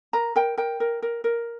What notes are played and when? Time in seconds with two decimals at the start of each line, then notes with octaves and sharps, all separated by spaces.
0.13 A#4 A#5
0.36 A#4 G5
0.58 A#4 G5
0.80 A#4
1.02 A#4
1.24 A#4